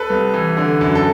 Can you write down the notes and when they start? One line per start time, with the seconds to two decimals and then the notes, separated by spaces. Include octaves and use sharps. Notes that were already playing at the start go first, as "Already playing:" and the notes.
Already playing: A4 B4
0.10 C2
0.34 E3
0.57 D3
0.81 F#2
0.95 A4